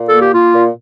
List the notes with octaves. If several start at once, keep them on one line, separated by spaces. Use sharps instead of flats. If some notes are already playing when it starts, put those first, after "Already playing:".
Already playing: A#2
A#3 A4
G4
A#3 F4
A#2